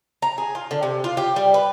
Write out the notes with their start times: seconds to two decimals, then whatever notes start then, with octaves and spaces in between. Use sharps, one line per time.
0.22 A#5
0.38 G#4
0.55 F4
0.71 D3
0.83 C3
1.04 F4
1.17 G4
1.36 G3
1.54 B4